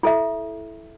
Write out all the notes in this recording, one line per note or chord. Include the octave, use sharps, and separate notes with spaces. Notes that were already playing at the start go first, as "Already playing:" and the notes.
E4 A4 E5